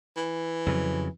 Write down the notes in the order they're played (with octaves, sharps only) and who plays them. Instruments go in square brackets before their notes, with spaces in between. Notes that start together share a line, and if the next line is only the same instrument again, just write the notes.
[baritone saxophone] E3
[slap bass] F2 C#3 F#3